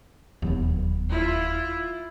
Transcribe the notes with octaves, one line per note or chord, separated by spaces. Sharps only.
E1 D#2 F#3 B3
E4 F4